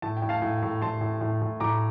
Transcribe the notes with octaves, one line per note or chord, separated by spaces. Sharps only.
A2 A5
G5
A2
F5 A5
A2
A2
A2 A5 C6
A2
A2
A2
A2 A#5 D6